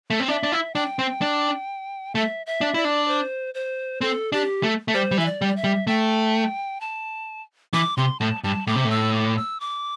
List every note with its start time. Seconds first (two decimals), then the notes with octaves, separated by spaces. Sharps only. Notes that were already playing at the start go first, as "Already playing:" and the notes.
0.10 A3
0.20 C4
0.28 D4 E5
0.43 D4
0.52 E4
0.75 D4 G5
0.99 C4
1.22 D4
2.15 A3 E5
2.46 E5
2.61 D4
2.74 E4 D5
2.85 D4
3.08 C5
3.54 C5
4.01 C4 A4
4.32 D4 G4
4.63 A3
4.88 A3
4.94 G3 C5
5.11 G3
5.18 E3 E5
5.26 D5
5.42 G3
5.48 D5
5.56 E5
5.64 G3
5.87 A3 G5
6.81 A5
7.73 E3 D6
7.97 C3 C6
8.20 A2 A5
8.44 G2 A5
8.67 A2 D6
8.75 C3
8.85 A2
8.90 E6
9.14 D6
9.37 E6
9.60 D6